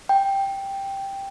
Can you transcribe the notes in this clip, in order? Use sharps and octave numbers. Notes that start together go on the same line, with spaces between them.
G5